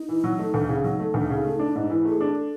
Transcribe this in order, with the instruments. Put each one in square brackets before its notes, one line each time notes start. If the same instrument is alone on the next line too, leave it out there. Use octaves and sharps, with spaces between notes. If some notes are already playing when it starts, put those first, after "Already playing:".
Already playing: [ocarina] D#4
[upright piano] E3
F#3
A3
D2
C#3
[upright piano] F#3 [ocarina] D#4
[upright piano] A3
D2
C#3
A3
D4
G#2
E3
[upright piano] A3 [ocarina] G#4
[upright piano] D4
[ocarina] A4